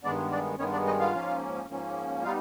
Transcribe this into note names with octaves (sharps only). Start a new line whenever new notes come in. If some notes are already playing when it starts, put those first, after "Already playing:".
G2 D#3 G#3 B3 D4 D5
D4 D5
G2 D#3 G#3 B3 C#4 C#5
D4 D5
D#4 D#5
F4 F5
G#2 F3 A#3 C#4
G#2 F3 A#3 C#4
G3 B3 D#4 F4 F5